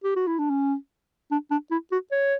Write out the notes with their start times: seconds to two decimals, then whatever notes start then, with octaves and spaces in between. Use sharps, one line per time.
0.04 G4
0.16 F#4
0.27 E4
0.39 D4
0.50 C#4
1.31 D4
1.51 D4
1.71 E4
1.92 F#4
2.11 C#5